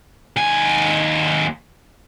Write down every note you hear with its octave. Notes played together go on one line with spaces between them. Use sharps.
D#2 G#5